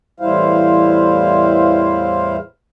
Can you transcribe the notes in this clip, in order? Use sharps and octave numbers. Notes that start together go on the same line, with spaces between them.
E2 A2 G3 E4 C5 F5